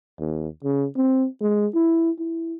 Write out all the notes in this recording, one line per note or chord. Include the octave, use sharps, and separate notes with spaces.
D#2
C#3
C4
G#3
E4
E4